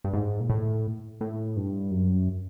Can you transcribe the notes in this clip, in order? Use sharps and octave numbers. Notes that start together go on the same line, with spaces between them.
G2
G#2
A#2
A2
A2
G2
F#2